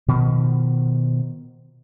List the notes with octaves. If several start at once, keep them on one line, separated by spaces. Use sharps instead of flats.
B2 D#3 F3